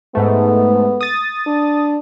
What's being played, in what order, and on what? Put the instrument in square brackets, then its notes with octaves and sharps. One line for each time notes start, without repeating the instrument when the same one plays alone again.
[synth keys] G#2 A3 [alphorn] B3
[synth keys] D#6 A6
[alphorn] D4